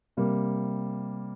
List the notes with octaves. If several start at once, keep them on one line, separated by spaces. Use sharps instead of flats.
C3 G3 A#3